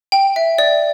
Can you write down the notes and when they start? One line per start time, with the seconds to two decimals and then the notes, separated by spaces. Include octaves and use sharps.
0.12 G5
0.36 E5
0.58 D5